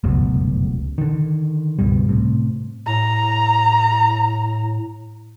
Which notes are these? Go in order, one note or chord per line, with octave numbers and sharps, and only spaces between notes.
F1 C#2 F#2 B2
D3 D#3
C#2 G2 B2 G3
A2 C3
A2 A#5